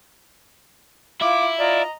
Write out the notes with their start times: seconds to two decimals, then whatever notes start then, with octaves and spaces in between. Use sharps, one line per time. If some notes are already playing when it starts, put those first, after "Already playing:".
1.22 E4 F4 F5 D6
1.58 F4 D5 D#5 A#5